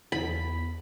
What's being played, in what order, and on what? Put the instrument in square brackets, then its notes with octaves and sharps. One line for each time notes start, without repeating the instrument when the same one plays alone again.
[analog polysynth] E2 [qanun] B5